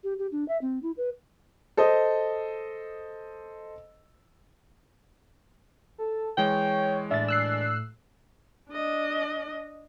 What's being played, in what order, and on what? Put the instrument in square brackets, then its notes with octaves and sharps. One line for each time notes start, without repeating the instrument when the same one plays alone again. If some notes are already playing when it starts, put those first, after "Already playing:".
[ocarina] G4
G4
D4
E5
C4
E4
B4
[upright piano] A4 C5 D#5
[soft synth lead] A4
[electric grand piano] E3 G#3 [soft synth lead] C#5 [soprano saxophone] G5
[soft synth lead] A2 [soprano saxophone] D4 [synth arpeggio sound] E5 A6
[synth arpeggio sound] E6 F#6 C7
[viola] D4 D#5